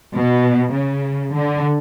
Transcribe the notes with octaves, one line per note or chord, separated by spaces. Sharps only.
B2
C#3
D3